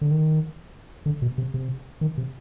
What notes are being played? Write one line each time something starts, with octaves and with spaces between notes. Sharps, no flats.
D3
D#3
D3
B2
C3
C3
D#3
C3